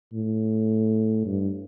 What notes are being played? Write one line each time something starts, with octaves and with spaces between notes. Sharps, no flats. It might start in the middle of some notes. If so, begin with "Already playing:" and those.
A2
G2